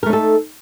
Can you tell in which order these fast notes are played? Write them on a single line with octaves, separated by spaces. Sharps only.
A#4 A3 D#4 A4